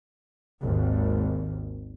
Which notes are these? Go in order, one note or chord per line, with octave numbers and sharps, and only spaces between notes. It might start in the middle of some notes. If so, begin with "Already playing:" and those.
G#1 D#2